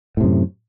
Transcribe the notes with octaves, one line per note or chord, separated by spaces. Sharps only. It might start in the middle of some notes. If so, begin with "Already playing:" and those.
F#2 A2 C3